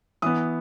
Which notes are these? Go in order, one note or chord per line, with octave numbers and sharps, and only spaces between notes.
E3 B3 D#6